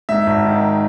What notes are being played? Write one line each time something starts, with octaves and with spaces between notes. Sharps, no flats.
G#2 E5
G#1
D#3